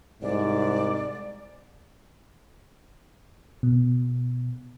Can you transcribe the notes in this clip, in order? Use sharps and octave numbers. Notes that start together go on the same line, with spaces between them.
C2 G#2 D5
B2